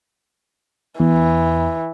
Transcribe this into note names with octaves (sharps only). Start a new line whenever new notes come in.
E2 E3